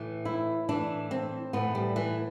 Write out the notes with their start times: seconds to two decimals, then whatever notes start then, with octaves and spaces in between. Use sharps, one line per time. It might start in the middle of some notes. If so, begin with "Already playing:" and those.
Already playing: A2 E3
0.25 E4
0.69 A2 E3 D4
1.11 C4
1.53 A2 E3 B3
1.75 G3
1.96 E3